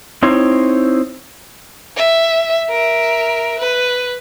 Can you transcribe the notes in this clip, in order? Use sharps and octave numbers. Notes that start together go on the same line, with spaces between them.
C4 D#4 E4 C5 C#5
E5
A#4 E5
B4